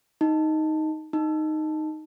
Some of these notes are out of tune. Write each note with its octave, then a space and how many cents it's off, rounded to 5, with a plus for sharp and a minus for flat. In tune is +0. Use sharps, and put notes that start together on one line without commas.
D#4 +5
D#4 -5